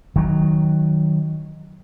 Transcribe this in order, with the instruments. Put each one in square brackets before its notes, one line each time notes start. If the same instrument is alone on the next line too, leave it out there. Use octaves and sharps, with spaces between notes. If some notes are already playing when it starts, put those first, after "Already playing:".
[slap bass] D#3 F#3